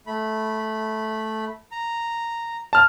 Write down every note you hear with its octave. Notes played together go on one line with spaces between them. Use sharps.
A3 B5
A#5
A5 F6